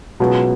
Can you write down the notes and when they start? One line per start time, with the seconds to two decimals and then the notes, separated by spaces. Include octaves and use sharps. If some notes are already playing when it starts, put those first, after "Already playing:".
0.20 C#2 B2 F#3 B3